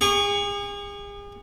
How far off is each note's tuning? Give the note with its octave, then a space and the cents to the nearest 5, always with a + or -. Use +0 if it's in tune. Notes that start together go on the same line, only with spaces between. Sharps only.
G#4 -40 C#6 +15